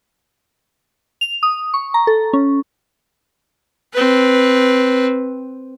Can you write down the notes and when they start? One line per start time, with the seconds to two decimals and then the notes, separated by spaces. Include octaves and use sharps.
1.21 F7
1.43 D#6
1.74 C#6
1.94 A#5
2.07 A4
2.33 C#4
3.93 C4 B4